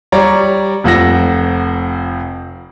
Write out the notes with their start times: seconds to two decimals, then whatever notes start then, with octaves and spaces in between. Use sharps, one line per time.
0.12 G3 C#5 D5 A#5
0.84 F1 F3 F#5 E6 A#6